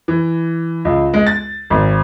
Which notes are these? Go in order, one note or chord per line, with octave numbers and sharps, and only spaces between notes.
E3
C#2
G#3
A6
G#1